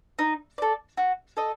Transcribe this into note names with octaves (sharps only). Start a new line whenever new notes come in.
D#4
A4 D5
F#4
A4 D#5